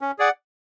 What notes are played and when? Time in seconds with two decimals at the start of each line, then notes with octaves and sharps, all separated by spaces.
0.01 C#4
0.19 G#4 D5 F#5